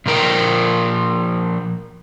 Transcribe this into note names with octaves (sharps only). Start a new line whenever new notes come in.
A#2 F3 A#4 G5